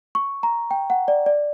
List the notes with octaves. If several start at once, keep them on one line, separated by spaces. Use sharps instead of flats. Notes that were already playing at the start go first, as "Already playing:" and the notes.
C#6
A#5
G5
F#5
D5
D5